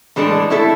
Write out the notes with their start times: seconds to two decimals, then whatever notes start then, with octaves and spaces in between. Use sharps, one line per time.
0.16 A2 E3 G#3 D4 A4
0.50 A3 E4 A4